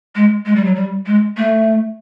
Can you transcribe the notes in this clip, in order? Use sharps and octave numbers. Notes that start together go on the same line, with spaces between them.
G#3
G#3
G3
F#3
G3
G#3
A3